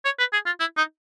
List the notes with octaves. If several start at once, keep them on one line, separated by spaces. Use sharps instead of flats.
C#5
B4
G#4
F4
E4
D#4